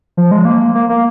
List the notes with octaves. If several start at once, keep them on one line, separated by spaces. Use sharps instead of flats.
F3
G#3
A#3
A#3
A#3